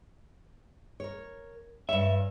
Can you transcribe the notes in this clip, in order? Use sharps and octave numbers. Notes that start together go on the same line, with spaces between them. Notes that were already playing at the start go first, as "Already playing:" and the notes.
A#4 C#5
G2 C#5 E5